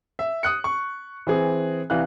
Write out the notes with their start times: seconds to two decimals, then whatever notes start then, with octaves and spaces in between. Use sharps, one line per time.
0.19 E5
0.43 D#6 F#6 C#7
0.64 C#6
1.27 E3 C4 G#4
1.90 C2 E3 F5 F#6